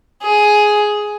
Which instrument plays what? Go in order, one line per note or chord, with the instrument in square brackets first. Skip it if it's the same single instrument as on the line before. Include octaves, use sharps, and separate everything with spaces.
[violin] G#4